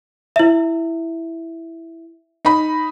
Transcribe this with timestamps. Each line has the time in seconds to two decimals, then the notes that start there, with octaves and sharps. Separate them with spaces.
0.36 E4 E5
2.45 D#4 B5